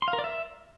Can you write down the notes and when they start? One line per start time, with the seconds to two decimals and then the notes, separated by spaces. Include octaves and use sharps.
0.02 C6
0.08 F5
0.13 A#4
0.19 D5
0.24 E5